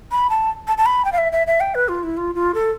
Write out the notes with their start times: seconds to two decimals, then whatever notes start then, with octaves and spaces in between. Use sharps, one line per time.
0.12 B5
0.30 A5
0.67 A5
0.78 A5
0.86 B5
1.05 G5
1.12 F5
1.18 E5
1.32 E5
1.47 E5
1.60 G5
1.75 B4
1.88 F4
2.03 E4
2.17 F4
2.35 F4
2.54 A4